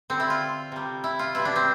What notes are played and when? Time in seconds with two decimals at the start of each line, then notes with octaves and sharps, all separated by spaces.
0.10 D3 G3 C4
0.20 E4
0.30 F4
0.72 C3 G3
1.04 E4
1.19 F4
1.35 B2 G3 E4
1.45 D4
1.56 C4